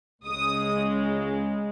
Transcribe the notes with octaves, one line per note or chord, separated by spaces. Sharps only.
C#2 C#3 G#3 D#6